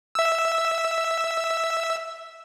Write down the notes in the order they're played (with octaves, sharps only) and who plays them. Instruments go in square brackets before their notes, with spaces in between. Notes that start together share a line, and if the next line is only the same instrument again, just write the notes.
[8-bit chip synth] E5 E6